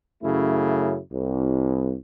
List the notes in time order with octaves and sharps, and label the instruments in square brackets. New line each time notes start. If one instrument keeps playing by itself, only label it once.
[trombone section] F#2 C#3 A3 E4
C2